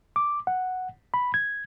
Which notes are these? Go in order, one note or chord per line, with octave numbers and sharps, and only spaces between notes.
D6
F#5
B5
G#6